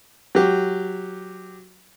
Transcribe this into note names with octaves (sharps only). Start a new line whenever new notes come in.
F#3 G4